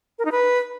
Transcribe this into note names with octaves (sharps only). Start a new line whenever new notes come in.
A#4
D#4
B4